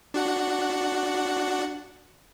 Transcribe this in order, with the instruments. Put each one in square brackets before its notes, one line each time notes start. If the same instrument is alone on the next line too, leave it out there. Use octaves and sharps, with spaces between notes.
[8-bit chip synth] D4 F#4 F#5